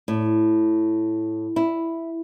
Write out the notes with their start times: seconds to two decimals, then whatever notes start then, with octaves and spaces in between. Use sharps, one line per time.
0.08 A2
1.56 E4